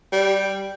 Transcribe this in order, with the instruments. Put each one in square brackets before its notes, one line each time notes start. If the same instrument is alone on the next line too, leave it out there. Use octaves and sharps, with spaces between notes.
[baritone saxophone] G3